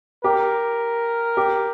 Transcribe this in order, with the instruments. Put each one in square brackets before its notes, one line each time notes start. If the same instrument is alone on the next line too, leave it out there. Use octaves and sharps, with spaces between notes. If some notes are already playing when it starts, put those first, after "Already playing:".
[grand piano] G4 [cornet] A#4
[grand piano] G4